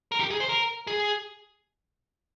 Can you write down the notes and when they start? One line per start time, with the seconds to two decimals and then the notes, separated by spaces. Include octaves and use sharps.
0.12 A#4
0.20 G4
0.31 G#4
0.40 C5
0.49 A#4
0.87 G#4